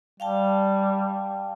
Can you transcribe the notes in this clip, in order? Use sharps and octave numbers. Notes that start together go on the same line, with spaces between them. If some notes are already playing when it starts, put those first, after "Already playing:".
G3 F5 G5 A5